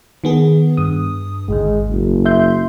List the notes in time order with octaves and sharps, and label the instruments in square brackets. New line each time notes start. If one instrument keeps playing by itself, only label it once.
[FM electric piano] D#3 B3 G#4
G2 D#6
[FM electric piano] G#1 D2 G#2 [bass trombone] G#3
[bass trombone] F#1
[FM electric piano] E5 C6 G6